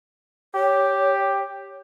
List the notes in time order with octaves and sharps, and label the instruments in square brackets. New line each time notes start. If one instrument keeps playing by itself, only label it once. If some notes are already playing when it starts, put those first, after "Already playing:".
[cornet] G4 [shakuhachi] C#5